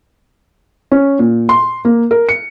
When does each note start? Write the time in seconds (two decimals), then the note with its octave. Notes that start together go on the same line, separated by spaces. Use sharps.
0.92 C#4
1.19 A#2
1.49 C6
1.85 A#3
2.11 A#4
2.29 C#7